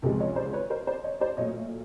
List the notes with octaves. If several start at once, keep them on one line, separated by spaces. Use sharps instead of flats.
C#2 C3 F3 G#3 G4 A4
C#5 D#5
C5 D5
B4 C#5
A#4 C5
C5 D5
C#5 D#5
C5 D5
A#2 F#3 A3 C#5 D#5